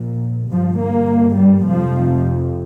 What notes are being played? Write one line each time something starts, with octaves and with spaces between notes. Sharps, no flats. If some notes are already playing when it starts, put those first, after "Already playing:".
Already playing: A#1 A#2
G1 G2 F3
A#3
G3
F1 F2 C3 F3